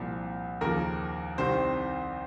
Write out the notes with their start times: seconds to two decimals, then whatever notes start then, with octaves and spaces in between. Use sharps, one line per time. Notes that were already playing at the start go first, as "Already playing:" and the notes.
Already playing: C2 A#2 F3
0.61 D#2 C#3 F3 A#4
1.38 C2 C3 D#3 C5